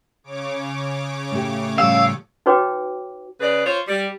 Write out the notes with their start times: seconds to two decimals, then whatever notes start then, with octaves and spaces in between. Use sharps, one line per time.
0.24 C#3 C#5 D6
1.31 A2 A3 G4
1.78 A2 F3 G3 F5 E6
2.46 D#4 F#4 B4 C#5 G5 D6
3.40 C#3 G#4 B4 D5
3.64 F4 C5 C#5
3.87 G3